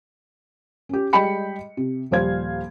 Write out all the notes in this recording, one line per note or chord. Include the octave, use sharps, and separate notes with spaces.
C#4 G4
G3 G#3 D#5 G5 B5 C#7
C3
D#1 F3 G3 C5 F5 G#6